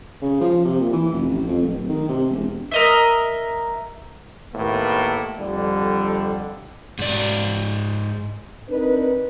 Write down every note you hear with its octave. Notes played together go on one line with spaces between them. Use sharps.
C#3
F3
C3
A#2
E3
F1
A1
F2
D1
D#3
C3
E1
A#4 D#5 E5
D#2 A2 A#3 B3
F2 D3 G3
G#2 D5
C4 D4 D#4 A#4 B4